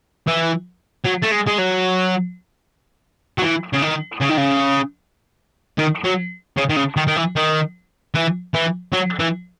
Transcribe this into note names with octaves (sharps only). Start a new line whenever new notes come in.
E3
F#3
A3
G#3
G#3
F#3
F#3
E3
C#3
D#3
C#3
D#3
C#3
D#3
F#3
C#3
D#3
C#3
D#3
D#3
E3
D#3
E3
E3
F#3
E3